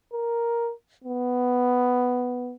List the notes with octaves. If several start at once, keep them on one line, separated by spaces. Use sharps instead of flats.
A#4
B3